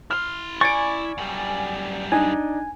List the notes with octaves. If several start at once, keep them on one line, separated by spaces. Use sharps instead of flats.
E4 C6 F6
D5 G#5 C#6 A6 C#7 D7
F#2 G3
D4 D#4 G#5